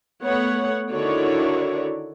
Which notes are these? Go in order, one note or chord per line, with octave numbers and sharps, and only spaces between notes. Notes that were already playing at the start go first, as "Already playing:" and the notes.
A3 B3 C#5 F#5
D3 D#3 E4 F#4 C#5 D5